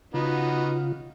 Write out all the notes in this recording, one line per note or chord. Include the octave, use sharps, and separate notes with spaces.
C#3 B3 D#4 F4 F#4